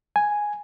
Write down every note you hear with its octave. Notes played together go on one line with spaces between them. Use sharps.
G#5